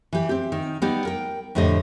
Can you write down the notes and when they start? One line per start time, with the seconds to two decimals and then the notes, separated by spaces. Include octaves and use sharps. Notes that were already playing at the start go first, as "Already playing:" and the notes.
0.13 E3 G4
0.29 C4 G4
0.52 D#3
0.82 G3 B3 D#4 G4
1.05 A#4 G5
1.55 F2 A2 D3 G4 D#5